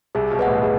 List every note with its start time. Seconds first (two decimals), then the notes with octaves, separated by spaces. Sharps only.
0.15 C2 C3 G#4
0.31 B1 B2
0.39 B4 D#5 F#5
0.47 A1 A2
0.63 G#4